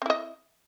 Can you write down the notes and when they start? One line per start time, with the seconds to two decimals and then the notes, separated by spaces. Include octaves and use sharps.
0.02 C4
0.06 E4
0.10 D#5